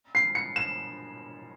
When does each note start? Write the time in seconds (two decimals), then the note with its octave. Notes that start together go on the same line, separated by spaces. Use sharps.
0.15 C7
0.35 C#7
0.56 E7